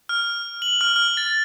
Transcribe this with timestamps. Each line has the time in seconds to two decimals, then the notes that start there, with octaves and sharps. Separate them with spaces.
0.09 F6
0.62 F#7
0.81 F6
0.96 F6
1.17 A6